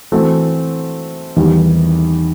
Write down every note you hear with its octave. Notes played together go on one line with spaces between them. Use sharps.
E3 A3 C4 F#4 A4
E2 D#3 G3